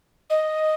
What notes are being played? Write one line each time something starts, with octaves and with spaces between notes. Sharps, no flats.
D#5